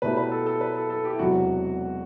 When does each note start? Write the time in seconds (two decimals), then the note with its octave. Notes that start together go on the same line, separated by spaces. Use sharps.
0.02 B2 A3 E4 G4 B4
0.17 B4
0.32 A4
0.46 A4
0.61 B4
0.75 A4
0.90 A4
1.05 G4
1.13 E4
1.19 E1 E2 C3 F#3 F#4